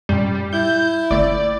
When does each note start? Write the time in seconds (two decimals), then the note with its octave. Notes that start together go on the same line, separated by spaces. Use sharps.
0.09 F#2 A#2 G3
0.53 E4 G6
1.11 G1 A3 C4 D5